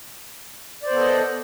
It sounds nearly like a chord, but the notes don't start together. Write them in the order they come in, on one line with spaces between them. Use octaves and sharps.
D5 C5 B3 A4 D#5